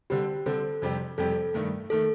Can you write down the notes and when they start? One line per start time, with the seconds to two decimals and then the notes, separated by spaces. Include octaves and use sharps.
0.10 D3 G3 C4 G4
0.46 D3 G3 C4 A4
0.82 F2 C3 G3 C4 G4
1.18 F2 C3 G3 C4 G4 A4
1.54 G2 D#3 A3
1.90 D#3 A3 A4